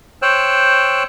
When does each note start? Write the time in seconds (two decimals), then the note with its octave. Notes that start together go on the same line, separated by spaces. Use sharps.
0.22 C5 C#5 G5 E6 F#6